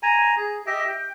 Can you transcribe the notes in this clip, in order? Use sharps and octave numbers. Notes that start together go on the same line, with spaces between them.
G#5 A#5
G#4
G4 D#5 E5
G5